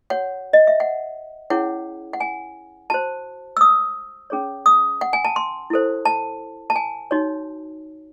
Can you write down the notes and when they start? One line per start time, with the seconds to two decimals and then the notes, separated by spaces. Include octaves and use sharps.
0.10 F#4 C#5 F#5
0.53 D#5
0.67 E5
0.80 F#5
1.50 C#4 E4 G#4 C#5 F#5
2.13 F#5
2.20 G#5
2.90 F#4 C5 A5
3.57 E6
3.61 D#6
4.30 C#4 G#4 C#5
4.66 D#6
5.01 F#5
5.13 G#5
5.25 A5
5.36 C6
5.70 E4 A4 C5
6.05 A5
6.70 A5
6.76 G#5
7.11 D#4 F#4 C#5